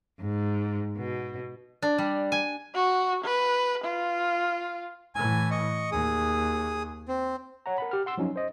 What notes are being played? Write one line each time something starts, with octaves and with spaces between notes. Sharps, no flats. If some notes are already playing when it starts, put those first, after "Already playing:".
G#2
B2
D4
G3
G#5
F#4
B4
F4
A2 E3 G#5
D#5 C#6
D#2 G#4 D#6
C4
C#5 F#5 A#5
A#4 F#5 B5
G4 F6
F#5 C6 E6
F3 F#3 C#4 D#4
C5 D#5